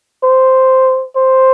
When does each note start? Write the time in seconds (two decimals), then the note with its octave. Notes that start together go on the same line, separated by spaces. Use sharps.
0.23 C5
1.16 C5